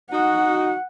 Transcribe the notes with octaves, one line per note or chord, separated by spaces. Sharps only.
D#4 F#4 F#5